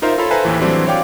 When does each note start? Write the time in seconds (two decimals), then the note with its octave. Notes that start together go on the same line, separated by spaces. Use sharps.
0.02 D#4 F4 A#4 C5 E5 C6
0.18 F4 A4 C#5 F5 B5
0.31 A4 B4 C5 E5 G#5 A#5
0.45 D#2 A2 E3
0.61 E3 F#3 G3 C4 D4 E4
0.86 C#5 D5 F5 G5 D6